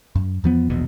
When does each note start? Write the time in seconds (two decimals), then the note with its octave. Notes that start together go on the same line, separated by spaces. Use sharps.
0.15 F#2
0.44 E2 F3 B3
0.70 E1 A#1 E2 B2